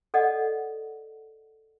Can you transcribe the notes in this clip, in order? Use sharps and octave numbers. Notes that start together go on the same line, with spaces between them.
A4 D5 D#5 F#5